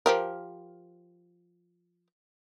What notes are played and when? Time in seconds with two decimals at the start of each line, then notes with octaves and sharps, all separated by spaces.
0.06 F3 G4 A#4